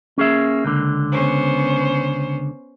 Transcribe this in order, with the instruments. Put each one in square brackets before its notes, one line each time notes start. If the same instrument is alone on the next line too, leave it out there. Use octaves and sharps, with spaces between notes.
[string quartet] A#3 [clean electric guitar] C#4 G#4 E5
[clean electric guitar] C#2 D3
[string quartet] B3 C#4 C5